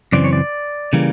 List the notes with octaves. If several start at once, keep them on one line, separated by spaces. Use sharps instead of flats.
F#2 C#3 E3 C4 D5
C#5
D5
C#3 E3 G3 A#3